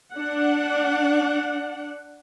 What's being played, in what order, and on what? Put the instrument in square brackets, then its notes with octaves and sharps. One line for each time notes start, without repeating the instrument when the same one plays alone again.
[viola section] D4 F#5